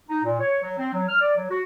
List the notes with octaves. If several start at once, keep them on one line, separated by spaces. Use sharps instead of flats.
D#4
A#2
C#5
F#3
C4
F#3
F6
D5
F#3
F#4